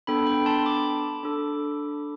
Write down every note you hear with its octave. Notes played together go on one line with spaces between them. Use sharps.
B3 D4 A4 G5 B5
G5 B5
A5 C6
B5 D6
D4 A4